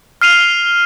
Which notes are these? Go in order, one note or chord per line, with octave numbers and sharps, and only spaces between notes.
F6 C7 D#7 F7 G7